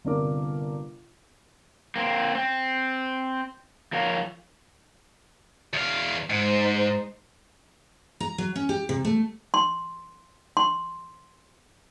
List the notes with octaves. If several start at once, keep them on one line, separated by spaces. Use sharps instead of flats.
G1 C3 D4 A#4 D6
A#3 C4
C4
F3 A#4 C#5 F5
E2 F5
G#2 G#3 D#4 C5
A#5
F#3
C#4
G4
C3
A3
C6
C6